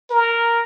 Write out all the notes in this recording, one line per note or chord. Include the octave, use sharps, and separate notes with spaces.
A#4